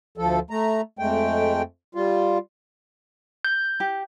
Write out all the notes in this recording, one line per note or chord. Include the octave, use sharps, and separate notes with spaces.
D2 F3 A4
A3 A#5
F2 G#3 A3 G5
G3 F4
G6
G4